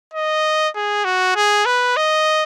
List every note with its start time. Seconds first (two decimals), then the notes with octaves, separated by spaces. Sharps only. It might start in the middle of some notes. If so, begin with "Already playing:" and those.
0.14 D#5
0.75 G#4
1.05 F#4
1.36 G#4
1.66 B4
1.96 D#5